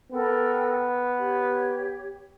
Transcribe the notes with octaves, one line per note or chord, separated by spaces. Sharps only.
B3 A4 A#4 G5
G4 C#5